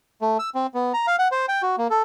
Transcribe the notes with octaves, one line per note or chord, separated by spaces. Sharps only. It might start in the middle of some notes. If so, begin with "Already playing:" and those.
A3
E6
C4
B3
A#5
F5
F#5
C5
G5
F#4
A#3
A4